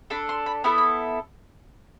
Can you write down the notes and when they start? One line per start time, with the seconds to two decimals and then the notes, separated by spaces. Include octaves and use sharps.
0.10 D4 A4 B5
0.29 C6
0.46 B5
0.64 B3 E4 A4 B5
0.78 B5